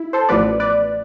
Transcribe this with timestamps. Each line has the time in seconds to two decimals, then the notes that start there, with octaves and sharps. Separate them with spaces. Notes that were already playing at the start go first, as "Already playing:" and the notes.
Already playing: E4
0.13 A4 C5
0.29 A1 A2 F3 B3 B4 D5
0.60 B4 D5